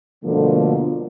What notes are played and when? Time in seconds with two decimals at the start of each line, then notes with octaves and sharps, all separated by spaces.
0.24 G2 B2 D3 F3 A3 A#3